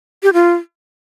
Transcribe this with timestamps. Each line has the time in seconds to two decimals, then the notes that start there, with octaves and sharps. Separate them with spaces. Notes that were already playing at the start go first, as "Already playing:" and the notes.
0.23 G4
0.33 F4